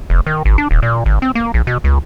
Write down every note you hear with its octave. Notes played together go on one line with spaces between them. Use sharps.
F1
D#3
G#1
D4
D#1
A#2
G#1
C4
A#3
A#1
B2
C#2